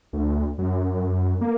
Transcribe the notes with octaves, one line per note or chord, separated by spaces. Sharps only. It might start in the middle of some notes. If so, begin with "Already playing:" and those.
D2
F#2
A#3